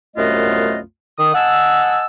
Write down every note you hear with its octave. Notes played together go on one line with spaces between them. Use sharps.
C2 F#2 A3 B3 F4 D#5
D#3 D#6
D#5 F#5 G#5 A5 E6